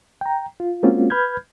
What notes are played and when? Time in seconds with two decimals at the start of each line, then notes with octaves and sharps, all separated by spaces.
0.21 G5 A#5
0.60 F4
0.83 G#3 A#3 C4 C#4 F4 F#4
1.10 B4 B5 F6 G6 G#6